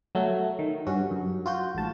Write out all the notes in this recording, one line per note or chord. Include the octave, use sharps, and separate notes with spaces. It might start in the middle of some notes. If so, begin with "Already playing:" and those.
F#3 A3
D#3
G2 C#4 F#4
F#2
F4 F#4 G6
A1 G#2 A5